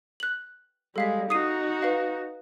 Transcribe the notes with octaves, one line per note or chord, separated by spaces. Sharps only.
F#6 F#7
G3 G#3 A4 F5 B6
D#4 F#4 D#6 C7 D#7
B4 F5